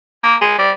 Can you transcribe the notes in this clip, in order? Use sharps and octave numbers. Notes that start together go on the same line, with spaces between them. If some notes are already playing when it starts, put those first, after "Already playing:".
A#3
G#3
G3